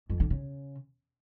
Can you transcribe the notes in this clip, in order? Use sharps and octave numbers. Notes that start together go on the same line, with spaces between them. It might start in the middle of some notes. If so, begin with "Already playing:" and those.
F2
D3
C#3